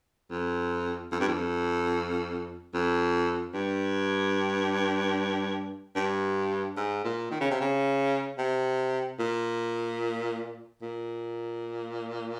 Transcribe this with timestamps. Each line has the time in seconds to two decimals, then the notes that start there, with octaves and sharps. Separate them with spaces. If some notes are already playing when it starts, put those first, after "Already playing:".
0.31 F2
1.12 F2
1.20 G2
1.28 F2
2.74 F2
3.54 G2
5.96 G2
6.77 G#2
7.04 A#2
7.31 D#3
7.41 C#3
7.51 C3
7.61 C#3
8.38 C3
9.19 A#2
10.81 A#2